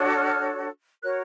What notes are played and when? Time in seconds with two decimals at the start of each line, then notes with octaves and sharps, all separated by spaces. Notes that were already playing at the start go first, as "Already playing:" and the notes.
Already playing: D4 F#4 A4 C#5
0.16 F6
1.02 F#4 A#4 C#5 F#6